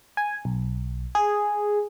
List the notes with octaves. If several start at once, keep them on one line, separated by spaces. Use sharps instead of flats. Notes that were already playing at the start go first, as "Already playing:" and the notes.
G#5
B1
G#4